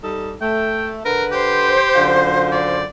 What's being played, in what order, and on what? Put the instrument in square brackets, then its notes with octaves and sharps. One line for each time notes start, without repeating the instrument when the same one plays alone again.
[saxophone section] G3 D#4 A4
[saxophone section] A3 [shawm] G5
[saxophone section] D3 B4 [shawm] A#4
[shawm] G4 [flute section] C5
[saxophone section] F#2 D3 F4
[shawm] D5